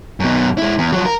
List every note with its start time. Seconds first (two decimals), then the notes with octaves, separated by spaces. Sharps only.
0.20 F#2 B2
0.58 G#3 E4
0.78 E2
0.93 F3 F#3
1.06 A#4